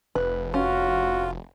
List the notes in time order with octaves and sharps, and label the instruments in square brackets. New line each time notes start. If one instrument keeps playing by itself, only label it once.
[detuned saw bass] F1 [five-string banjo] B4
[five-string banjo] C#4 [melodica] F4 [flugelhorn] F#4